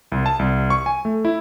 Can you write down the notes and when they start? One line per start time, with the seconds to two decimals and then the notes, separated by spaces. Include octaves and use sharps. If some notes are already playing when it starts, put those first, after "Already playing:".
0.12 C2
0.26 A5
0.39 C2
0.70 C#6
0.86 G#5
1.05 A3
1.25 E4